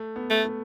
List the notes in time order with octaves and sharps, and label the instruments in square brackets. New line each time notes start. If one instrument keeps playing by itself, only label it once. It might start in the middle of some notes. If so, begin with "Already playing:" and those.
Already playing: [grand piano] A3
B3
[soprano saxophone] A3
[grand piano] A3